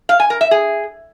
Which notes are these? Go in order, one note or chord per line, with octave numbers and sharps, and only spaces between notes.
F5
G#5
A#4
E5
G#4